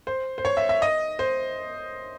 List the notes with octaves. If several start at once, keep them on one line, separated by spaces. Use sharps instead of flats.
C5
C5
C#5
E5
E5
D#5
C5